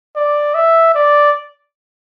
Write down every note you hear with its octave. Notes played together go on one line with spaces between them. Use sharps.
D5
E5
D5